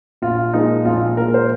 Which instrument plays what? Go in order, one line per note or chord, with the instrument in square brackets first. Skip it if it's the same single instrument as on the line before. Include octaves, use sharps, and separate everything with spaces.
[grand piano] A#1 F4
A#2 F3 G#3 D#4
A#1 F4
A#2 F3 G#3 A#4
C5